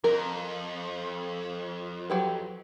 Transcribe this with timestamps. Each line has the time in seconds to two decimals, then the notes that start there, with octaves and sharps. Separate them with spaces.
0.04 F2 A#4
2.10 F#3 G4 B4